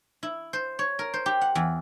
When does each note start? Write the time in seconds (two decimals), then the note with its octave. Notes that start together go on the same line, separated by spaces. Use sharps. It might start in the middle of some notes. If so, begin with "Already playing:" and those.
0.23 E4
0.53 C5
0.79 C#5
0.99 A#4
1.14 C5
1.26 G4
1.41 F#5
1.55 E2